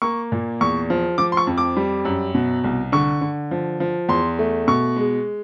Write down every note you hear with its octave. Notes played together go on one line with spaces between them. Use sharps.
A#3 C#6
A#2
E2 C#6
F3
F3 D6
C6
C#6
F2
D6
G3
F#2
B2
C2
D3 C#6
D3
F3
F3
E2 C6
A3
B2 C#6
G#3